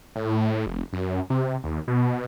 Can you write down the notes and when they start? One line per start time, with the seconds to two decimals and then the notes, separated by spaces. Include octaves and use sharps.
0.16 A2
0.66 F1
0.93 F#2
1.30 C3
1.64 D#2
1.88 B2